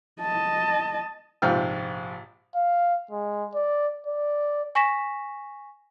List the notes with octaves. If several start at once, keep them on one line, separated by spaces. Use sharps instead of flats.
D#5 A5
A#1 G#2 C3 G5 F6
F5
G#3
D5
D5
G#5 C#6 A#6 B6 E7